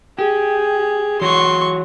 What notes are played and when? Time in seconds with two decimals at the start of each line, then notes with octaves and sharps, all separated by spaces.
0.19 G4 G#4
1.21 E3 F#4 C#5 C6 C#6